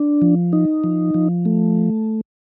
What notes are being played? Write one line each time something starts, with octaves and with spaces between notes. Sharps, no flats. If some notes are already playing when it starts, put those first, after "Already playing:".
Already playing: D4
F3
D#4
F3
F3
A3